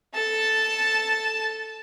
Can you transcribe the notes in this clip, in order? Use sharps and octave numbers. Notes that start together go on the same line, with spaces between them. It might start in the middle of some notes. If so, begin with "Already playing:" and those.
A4 A5